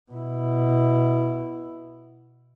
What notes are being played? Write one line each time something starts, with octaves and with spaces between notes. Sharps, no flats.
B2 E4